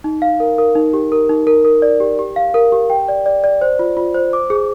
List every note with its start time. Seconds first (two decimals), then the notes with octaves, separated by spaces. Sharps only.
0.04 D#4
0.22 F5
0.40 A#4
0.58 A#4
0.75 D#4
0.93 G4
1.12 A#4
1.29 D#4
1.47 A#4
1.65 A#4
1.82 D5
2.00 G4
2.19 G4
2.36 F5
2.54 A#4
2.72 G4
2.90 G5
3.08 D5
3.26 D5
3.44 D5
3.61 C5
3.79 F4
3.97 F4
4.14 C5
4.33 D6
4.50 G#4